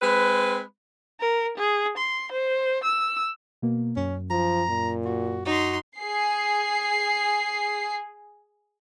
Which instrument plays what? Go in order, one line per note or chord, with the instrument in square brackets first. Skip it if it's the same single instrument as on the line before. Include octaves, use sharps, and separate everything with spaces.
[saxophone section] G#3 C4 B4
[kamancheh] A#4
G#4
C6
C5
E6
[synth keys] B2 A#3
[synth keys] F#2 [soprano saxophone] C#4
[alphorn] F3 [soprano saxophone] A#5
[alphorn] A#2
[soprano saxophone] F#4
[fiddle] D#4 C6 [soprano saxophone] F#4
[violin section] G#4 C7